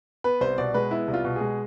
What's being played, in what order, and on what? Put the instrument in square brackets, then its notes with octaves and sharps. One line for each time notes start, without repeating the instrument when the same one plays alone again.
[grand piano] B3 B4
C2 C5
B2 D5
G#3 B4
B3 E4
C2
F4
B2
G#3 G#4